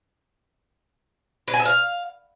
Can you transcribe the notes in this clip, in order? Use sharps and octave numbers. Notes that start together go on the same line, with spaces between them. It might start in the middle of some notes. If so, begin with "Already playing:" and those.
B4
G#5
E5
F5